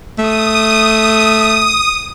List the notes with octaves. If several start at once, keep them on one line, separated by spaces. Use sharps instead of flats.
A3 D#6